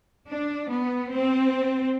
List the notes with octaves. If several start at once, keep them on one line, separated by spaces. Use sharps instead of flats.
D4
B3
C4